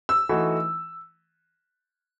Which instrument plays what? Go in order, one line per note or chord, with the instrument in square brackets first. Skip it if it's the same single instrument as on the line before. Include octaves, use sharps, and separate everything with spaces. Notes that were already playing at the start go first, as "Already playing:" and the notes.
[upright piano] E6
[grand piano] E3 A3 D#4 F#4